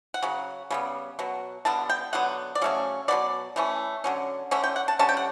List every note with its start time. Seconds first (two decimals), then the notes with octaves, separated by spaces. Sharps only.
0.14 F#5
0.23 C#3 F#3
0.70 C#3 G3 B3
1.19 B2 F#3
1.65 D3 G3 B3 A5
1.89 G5
2.13 D3 F#3 B3 F#5
2.55 D5
2.62 C#3 F#3 A3 C#4
3.08 B2 F#3 B3 D5
3.56 E3 A3 C#4
4.04 D3 F#3 C#4
4.51 D3 A3 C#4 E5
4.64 G5
4.76 F#5
4.88 A5
4.99 D3 G3 C#4 A5
5.09 G5
5.17 F#5